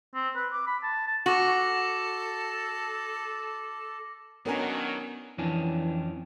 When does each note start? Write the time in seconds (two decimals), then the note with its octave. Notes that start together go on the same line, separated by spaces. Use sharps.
0.15 C4
0.36 B4
0.53 D6
0.67 B5
0.83 A5
1.08 A5
1.26 F#4 A4 D6 A#6 F#7
4.45 D#3 F#3 B3 C#4 D4 A#4 G#5
5.38 F2 E3 C#4 D4